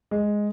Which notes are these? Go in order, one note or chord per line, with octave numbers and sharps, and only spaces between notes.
G#3